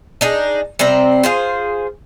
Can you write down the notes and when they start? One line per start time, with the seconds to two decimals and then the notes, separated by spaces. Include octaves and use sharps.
0.21 D4 D#4 G#4
0.79 C3 G3 C4 A#5
1.23 F4 G#4 C5